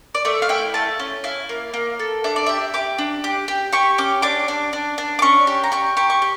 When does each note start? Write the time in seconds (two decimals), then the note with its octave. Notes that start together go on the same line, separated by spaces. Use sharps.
0.15 D5
0.25 A3 E5
0.42 F5
0.49 E4 G5
0.74 A3 A5
1.00 C#4
1.24 E4 F5
1.49 A#3
1.74 A#3
2.00 A4
2.24 D4 E5
2.36 D5
2.46 G4 E5
2.74 G4 D6
2.98 D4
3.24 G4
3.48 G4
3.73 G4 C#6
3.98 C#4 D6
4.22 D4 D6
4.48 D4
4.73 D4
4.98 D4
5.19 D6
5.22 C#4 C#6
5.47 G4
5.64 A#5
5.72 G4 C#6
5.97 G4 C#6
6.10 C#6
6.22 G4